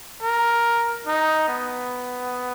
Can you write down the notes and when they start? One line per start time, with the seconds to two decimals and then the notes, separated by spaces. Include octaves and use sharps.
0.23 A#4
1.07 D#4
1.48 B3